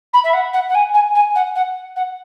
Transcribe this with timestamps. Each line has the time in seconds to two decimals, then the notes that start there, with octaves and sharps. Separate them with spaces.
0.13 B5
0.24 E5
0.33 F#5
0.53 F#5
0.69 F#5
0.74 G#5
0.94 G#5
1.15 G#5
1.35 F#5
1.55 F#5
1.96 F#5